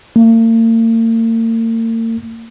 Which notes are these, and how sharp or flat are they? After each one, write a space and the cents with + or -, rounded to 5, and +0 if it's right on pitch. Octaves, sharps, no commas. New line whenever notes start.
A#3 -45